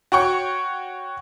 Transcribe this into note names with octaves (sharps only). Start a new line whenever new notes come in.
F#4 C#5 G5 C#6